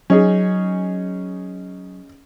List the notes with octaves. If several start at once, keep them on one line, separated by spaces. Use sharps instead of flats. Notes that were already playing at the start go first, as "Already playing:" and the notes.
F#3 C#4 D#4 G#4